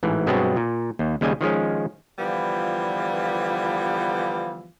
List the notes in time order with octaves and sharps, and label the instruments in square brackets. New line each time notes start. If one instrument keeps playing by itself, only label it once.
[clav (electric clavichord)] A1 G#2 E3
G2 B2 F#3 G#3 B3 C4
A#2
D#2
D#2 C#3 G3 G#3 D#5 G#5
D#3 F3 G#3 C#4
[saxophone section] D3 E3 F3 G3 B3 F4